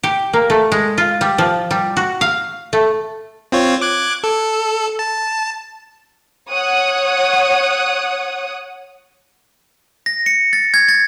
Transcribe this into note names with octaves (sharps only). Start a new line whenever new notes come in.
G4
A#3
A3
G#3
F4
G3
F3
G3
F#4
F5
A3
C4 F4 C#5
D6 F#6 G#6
A4
A5
C#5 F#5 D#6
A#6
C#7
A6
G#6
A6